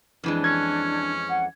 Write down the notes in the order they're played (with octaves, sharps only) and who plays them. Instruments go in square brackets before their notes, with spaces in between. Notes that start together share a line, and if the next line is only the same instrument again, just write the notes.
[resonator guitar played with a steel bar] F2 E3 G#3 [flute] D4
[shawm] C#4 [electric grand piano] G#6
[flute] F#5